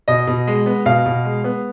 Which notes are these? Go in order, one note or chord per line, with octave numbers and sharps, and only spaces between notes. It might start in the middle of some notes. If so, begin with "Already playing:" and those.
B2 D#5
B2
G#3
B3
B2 F5
B2
G#3
B3